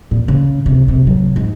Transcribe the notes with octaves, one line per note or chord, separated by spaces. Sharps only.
A#2
C#3
C3
C3
F#3
G#2